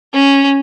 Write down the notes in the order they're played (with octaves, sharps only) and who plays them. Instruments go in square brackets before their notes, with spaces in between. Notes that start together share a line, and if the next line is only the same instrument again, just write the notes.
[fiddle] C#4